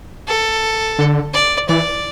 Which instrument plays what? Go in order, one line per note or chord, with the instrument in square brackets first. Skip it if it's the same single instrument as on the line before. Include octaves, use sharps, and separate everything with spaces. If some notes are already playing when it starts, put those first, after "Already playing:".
[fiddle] A4
[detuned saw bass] D3
[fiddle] D5
[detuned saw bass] E3 [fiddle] D5